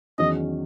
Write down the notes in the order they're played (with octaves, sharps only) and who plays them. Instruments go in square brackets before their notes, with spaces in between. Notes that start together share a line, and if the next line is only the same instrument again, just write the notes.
[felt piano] E2 D#3 F#3 C#4 G#4 [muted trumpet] D#5